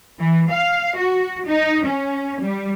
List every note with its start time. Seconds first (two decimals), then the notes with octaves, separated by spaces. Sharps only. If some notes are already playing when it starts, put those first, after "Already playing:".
0.19 E3
0.50 F5
0.96 F#4
1.45 D#4
1.84 C#4
2.41 G3